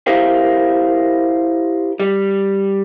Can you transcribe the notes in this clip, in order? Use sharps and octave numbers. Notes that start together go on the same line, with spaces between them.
E4 G4 A#4 C5 F5
G3